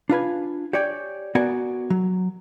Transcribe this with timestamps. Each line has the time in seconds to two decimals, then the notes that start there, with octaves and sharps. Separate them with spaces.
0.09 D4 F4 B4 G#5
0.73 G4 C#5 D5 G5 G#5
1.35 B3 F#4 A#4 D5 G#5
1.90 F#3